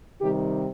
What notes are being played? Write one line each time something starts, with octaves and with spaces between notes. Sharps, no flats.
C3 D#3 G3 G4